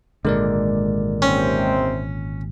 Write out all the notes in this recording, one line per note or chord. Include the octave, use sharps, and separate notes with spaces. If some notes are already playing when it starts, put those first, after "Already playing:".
G#1 A#2 D3 G#3 A#4 D5
D#2 C3 C4 C#4